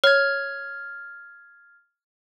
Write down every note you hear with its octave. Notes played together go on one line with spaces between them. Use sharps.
C#5 F6 G#6